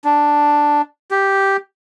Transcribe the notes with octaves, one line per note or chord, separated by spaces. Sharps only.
D4
G4